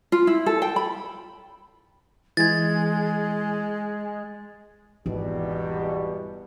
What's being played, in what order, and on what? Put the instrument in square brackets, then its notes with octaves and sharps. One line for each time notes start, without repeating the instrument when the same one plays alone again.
[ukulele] F4
E4
A4
G5
B5
[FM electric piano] E3 [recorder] G#3 [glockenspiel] G#6 A6
[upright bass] G#1 [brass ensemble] E2 B2 G3